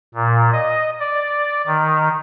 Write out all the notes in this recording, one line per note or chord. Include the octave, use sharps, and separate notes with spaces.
A#2
D#5
D5
D#3